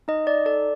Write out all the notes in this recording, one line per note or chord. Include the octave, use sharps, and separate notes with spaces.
D#4 D#5
D5
A4 D5